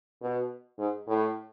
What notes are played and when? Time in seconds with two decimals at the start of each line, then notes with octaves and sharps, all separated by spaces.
0.22 B2
0.78 G#2
1.07 A2